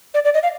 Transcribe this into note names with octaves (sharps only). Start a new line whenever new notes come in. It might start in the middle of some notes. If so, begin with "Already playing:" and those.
D5
D5
D#5
F5